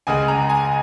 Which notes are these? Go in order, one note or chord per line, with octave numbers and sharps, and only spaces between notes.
C#2 C#3 G#3 G#5
A#5
G#5